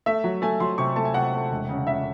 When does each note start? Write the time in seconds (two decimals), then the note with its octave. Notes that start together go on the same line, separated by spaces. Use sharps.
0.06 A3 E5
0.24 F#3
0.42 A3 G#5
0.60 F#3 C6
0.78 C3 C#6
0.96 A3 A5
1.05 G#5
1.14 C3 F#5
1.33 A3
1.51 E1
1.69 C#3
1.87 C#3 E5